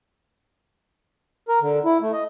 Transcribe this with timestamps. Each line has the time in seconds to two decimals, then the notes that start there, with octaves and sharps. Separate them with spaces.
1.48 A#4
1.61 D3
1.85 E4
2.01 A3
2.13 D#5